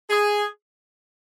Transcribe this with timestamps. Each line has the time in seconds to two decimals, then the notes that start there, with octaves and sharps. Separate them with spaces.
0.10 G#4